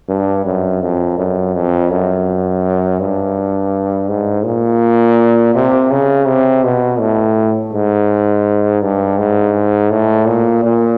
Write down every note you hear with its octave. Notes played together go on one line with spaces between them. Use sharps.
G2
F#2
F2
F#2
F2
F#2
G2
G#2
A#2
C3
C#3
C3
B2
A2
G#2
G2
G#2
A2
A#2
A#2